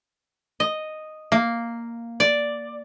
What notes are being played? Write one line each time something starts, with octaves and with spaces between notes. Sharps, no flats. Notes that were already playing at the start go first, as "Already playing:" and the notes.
D#5
A#3
D5